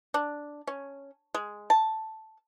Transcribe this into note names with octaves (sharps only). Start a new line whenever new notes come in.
D4
C#4
G#3
A5